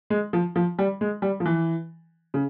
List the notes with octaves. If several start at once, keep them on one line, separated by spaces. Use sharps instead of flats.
G#3
F3
F3
G3
G#3
G3
F3
E3
C#3